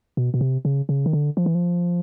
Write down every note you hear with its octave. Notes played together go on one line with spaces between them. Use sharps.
B2
B2
C3
C#3
C#3
D#3
D3
F3
E3
F3